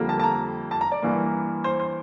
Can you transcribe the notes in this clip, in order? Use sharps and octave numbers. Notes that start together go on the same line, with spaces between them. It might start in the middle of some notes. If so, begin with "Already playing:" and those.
Already playing: F2 D3 G3 A#3
A5
A5
A#5
A5
A#5
D5
G2 E3 A#3
C5
C5